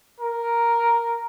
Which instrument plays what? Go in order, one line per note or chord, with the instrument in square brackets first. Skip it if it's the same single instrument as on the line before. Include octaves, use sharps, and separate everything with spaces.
[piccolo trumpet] A#4